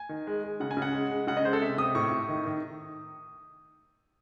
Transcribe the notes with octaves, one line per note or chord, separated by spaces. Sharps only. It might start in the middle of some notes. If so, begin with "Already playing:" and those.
Already playing: G#5
D#3
G#3
G#3
C#3 F#5
G#5
C#3
F#5
G#3
G#3
C#3 F#5
D#5
G#3 C5
A4
C3 E5
C3 D#6
A2 C#6
A2
D#3
D#3